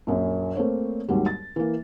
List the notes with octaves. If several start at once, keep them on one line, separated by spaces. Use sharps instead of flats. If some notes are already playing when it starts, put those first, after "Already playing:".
A#1 F#2
A3 A#3 C4 C#5
D#2 G#2 F#3 G3
A6
E3 A#3